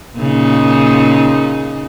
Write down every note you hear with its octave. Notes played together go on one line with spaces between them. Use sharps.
A#2 C#3 D#4